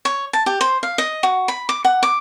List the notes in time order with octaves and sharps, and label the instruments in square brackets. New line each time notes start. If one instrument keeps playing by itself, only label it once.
[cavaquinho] C#5
A5
G4
C5
F5
D#5
F#4
B5
D6
F#5
D6